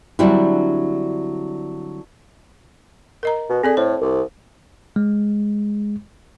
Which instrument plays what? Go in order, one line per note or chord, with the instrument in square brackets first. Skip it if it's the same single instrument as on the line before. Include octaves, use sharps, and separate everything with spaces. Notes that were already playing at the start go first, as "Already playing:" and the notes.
[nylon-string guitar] D3 F#3 G3 C4 D4 E4
[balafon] A#4 D#5 A#5
[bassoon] B2
[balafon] C4 A4 D5 [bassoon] G#4
[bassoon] A2 [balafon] C5
[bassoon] C2
[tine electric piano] G#3